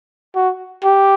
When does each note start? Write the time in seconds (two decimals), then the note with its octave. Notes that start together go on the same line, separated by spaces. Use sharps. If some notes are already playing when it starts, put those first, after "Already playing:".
0.35 F#4
0.84 G4